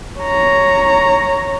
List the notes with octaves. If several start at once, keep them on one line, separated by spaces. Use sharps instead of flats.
C#5 A#5